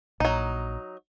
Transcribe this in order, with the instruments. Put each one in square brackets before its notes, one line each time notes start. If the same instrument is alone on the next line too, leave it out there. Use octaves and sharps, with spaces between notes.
[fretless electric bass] A#1 [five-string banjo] F#3 D#4